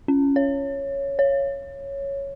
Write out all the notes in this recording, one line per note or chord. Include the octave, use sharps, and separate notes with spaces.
C#4
C#5
C#5